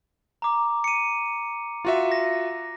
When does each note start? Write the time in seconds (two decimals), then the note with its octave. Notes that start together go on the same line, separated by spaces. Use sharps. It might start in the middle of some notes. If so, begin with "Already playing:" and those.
0.42 A#5 D6
0.84 C#7 D#7
1.85 F4 F#4 E5
2.12 A#6